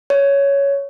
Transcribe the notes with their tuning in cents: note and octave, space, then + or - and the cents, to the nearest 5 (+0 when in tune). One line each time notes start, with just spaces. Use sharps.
C#5 +10